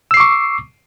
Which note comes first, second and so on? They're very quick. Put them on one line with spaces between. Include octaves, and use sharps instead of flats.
E6 C7 D6 C#6